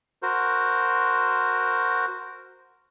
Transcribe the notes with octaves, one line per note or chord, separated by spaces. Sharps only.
F#4 A#4 C5